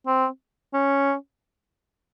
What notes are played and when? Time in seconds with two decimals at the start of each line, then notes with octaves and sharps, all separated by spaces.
0.07 C4
0.74 C#4